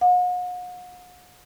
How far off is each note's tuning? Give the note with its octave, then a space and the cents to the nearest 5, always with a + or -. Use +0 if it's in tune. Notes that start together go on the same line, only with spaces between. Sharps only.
F#5 -45